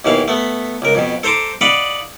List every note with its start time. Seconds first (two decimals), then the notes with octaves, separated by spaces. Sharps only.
0.05 D#2 B2 E3 F5
0.28 A3 B3
0.82 C#2 A#4
0.95 F2 B2
1.23 A4 C5 A#5 C6 D6
1.61 D5 D#5 F5 F#5 B5